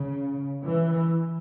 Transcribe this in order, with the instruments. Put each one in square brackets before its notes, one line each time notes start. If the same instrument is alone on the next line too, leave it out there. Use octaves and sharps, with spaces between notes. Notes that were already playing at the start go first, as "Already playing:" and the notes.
Already playing: [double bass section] C#3
E3